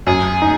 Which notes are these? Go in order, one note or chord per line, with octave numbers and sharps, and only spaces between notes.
F#2 G#4
D#4